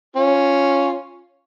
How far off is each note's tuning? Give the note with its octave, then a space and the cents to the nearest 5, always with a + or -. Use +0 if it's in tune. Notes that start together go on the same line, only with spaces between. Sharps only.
C#4 +0 F4 +0